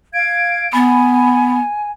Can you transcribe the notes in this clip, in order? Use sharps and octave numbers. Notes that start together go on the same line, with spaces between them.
F5 G#6 D7
B3 G#5 B5